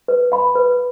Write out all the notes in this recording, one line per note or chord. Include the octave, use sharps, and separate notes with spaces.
B4
F5 B5
B4